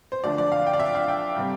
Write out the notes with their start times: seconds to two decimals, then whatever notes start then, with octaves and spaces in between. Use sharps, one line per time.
0.12 C5
0.24 D3 F3 A3 D4 D5
0.38 D5
0.52 F5
0.67 G5
0.73 D5
0.80 E5
0.95 F5
1.08 G5
1.37 C3 G3